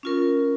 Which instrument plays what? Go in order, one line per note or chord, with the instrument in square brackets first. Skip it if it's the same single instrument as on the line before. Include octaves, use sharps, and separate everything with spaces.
[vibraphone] C#4 F4 A#4